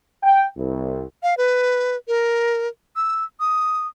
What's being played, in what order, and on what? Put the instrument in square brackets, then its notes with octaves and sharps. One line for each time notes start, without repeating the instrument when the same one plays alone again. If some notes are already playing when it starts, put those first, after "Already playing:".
[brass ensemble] G5
C2
[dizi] F5
B4
A#4
E6
D#6